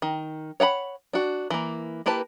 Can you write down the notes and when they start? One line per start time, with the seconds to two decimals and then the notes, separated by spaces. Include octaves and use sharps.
0.02 D#3
0.60 C#5 F#5 G5 B5
1.13 D4 F#4
1.50 E3 A#3
2.06 A#3 E4 G4 B4 A5